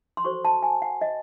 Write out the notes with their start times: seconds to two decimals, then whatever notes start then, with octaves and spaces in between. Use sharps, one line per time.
0.17 C6
0.24 F#4 A4 C5 C#6
0.45 A5
0.63 G#5
0.82 F#5
1.01 D#5